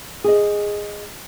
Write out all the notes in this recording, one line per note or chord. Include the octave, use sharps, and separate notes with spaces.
G#4 D#5